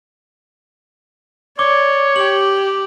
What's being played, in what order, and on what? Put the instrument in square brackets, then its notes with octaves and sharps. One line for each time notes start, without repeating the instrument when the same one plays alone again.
[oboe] C#5 [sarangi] D5 [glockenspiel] D6 G7
[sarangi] G4 [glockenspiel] F#7